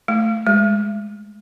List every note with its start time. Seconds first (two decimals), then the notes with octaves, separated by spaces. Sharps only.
0.08 A3
0.47 G#3